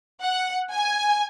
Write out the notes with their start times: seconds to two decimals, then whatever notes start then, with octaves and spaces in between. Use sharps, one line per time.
0.22 F#5
0.72 G#5